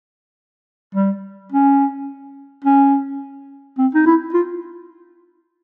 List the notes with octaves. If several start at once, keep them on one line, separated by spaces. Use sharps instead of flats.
G3
C#4
C#4
C4
D#4
E4
F4